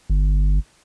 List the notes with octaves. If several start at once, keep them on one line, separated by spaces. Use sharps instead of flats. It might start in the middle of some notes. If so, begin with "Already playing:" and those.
G1